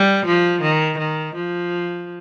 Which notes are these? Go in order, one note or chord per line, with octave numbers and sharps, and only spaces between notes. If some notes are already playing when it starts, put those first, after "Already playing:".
Already playing: G3
F3
D#3
D#3
F3